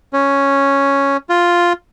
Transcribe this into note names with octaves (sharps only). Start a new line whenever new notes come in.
C#4
F4